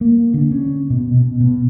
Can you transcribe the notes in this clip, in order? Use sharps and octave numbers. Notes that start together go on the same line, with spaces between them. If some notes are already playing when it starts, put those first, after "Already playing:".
A#3
D3
C#4
B2
B2
B2